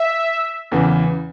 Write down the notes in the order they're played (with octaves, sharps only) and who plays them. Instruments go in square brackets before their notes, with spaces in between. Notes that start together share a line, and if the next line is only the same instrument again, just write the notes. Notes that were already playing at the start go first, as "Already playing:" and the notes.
Already playing: [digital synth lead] E5
[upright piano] E2 C#3 E3